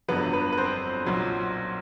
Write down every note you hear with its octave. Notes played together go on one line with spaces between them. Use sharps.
G1 F2 D3 F#3 B3 B4
B3 B4
B4
C4 C5
B1 A#2 F#3